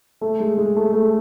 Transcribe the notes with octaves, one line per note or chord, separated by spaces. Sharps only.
A3
G#3
G#3
A3
A3